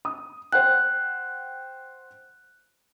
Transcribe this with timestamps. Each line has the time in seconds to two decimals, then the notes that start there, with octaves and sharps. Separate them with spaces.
0.05 D#6
0.52 C5 F#5 G5 F#6